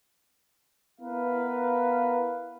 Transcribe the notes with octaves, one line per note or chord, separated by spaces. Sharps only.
B3 E4 A#4 B4 F5